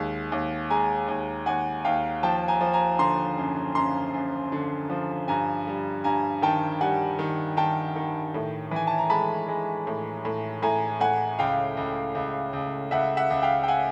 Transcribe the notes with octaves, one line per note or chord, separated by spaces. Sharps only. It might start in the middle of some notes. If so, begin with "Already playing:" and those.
Already playing: D#2 G#3
D#2
G#3 G#5 A#5
D#2
D#2 F#5 G#5
D#2 F5 G5
F3 G5 A5
G#5 A#5
F3
G#5 A#5
D3 A#5 C6
F#2
F#2 A#5 C6
F#2
D3
F3
G2 G#5 A#5
G3
G2 G#5 A#5
D#3 G5 A5
G3 F#5 G#5
D#3
D#3 G5 A5
D#3
A2
E3 G#5
A5
A#5
G#3 A5 B5
G#3
A2
A2
A2 G#5 A#5
A2 F#5 G#5
C#2 F5 G5
C#2
C#2
C#2
C#2 E5 F#5
E5 F#5
C#2
F5 G5
G5
F#5 G#5